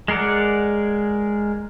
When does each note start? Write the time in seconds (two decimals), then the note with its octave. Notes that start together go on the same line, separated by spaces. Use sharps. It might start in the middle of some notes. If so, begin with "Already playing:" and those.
0.08 G#3 G#4 A#4 D5 F#5